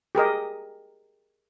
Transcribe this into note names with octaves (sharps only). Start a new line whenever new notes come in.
G4 G#4 A#4 D#5